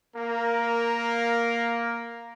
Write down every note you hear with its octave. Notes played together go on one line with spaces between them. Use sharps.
A#3 A#4